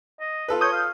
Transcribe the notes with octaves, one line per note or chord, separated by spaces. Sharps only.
D#5
F4 A4 B4
C#5 D#6 G6
F5